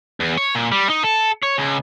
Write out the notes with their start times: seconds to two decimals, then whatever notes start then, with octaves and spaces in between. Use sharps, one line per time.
0.20 E2
0.38 C#5
0.55 A#2
0.72 G3
0.89 D#4
1.03 A4
1.43 C#5
1.59 C#2